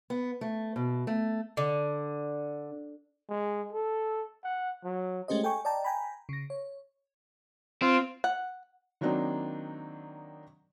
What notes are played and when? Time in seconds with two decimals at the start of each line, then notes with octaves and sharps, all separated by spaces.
0.10 B3
0.41 A3
0.76 B2
1.07 A3
1.57 D3
3.29 G#3
3.73 A4
4.44 F#5
4.84 F#3
5.28 G#3 A3 C#4 G4 C5 D#5
5.43 A4 G5 G#5 C#6
5.65 D5 D#5 G5 A5 A#5
5.85 G5 G#5 A#5 B5
6.29 C#3 A#6
6.50 C#5
7.82 C4 F4
8.24 F#5
9.01 D#3 F#3 A#3 C4 D4 D#4